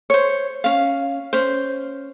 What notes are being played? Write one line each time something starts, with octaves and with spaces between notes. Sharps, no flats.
C5 C#5
C#4 F5
C#4 C5